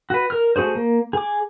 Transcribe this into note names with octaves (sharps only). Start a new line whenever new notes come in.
F#4 B4
A#4 F6
A3 C4 F#4 G#4 C5
A#3
G#4 D6